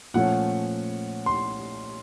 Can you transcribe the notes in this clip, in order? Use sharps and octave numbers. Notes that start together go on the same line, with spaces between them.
A#2 F3 A3 C#4 F#5
C6